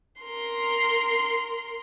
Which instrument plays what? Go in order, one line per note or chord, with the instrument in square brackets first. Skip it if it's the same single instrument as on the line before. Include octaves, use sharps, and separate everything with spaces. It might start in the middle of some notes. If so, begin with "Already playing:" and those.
[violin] A#4 C6